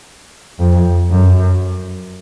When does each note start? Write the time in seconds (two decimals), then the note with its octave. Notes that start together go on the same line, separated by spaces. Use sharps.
0.59 F2
1.11 F#2